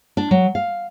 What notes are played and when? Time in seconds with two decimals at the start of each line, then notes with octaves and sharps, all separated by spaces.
0.17 D4
0.31 F#3
0.55 F5